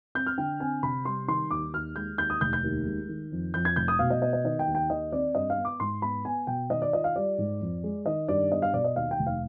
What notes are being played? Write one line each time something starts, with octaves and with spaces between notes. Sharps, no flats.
C4 G6
F6
D3 G5
C4 G#5
C3 B5
G3 C6
D#3 C6
D#2 D6
D#2 F6
G#3 G6
D#2 G6
D#6
F1 G6
G6
D#2
G#3
D#3
F2
F2 G6
G#6
F1 G6
D#6
B2 F5
D#5
B3 D#5
D#5
D#3 D#5
G5
D#2
G5
D#3 D#5
C4 D5
G2 D#5
F5
B3
D6
G#2 C6
B3 B5
B3 G#5
B2 G5
D#3 D#5
D5
F4 D#5
F5
G3 D5
G#2
F2
G#3
D#3 D#5
G2 D5
B3 D#5
F5
B2 D5
D#5
D#2 F5
G5
F1
F5